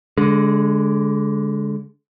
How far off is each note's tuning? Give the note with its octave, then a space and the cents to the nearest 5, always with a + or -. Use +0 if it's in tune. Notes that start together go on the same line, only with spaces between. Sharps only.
D3 -25 G#3 +0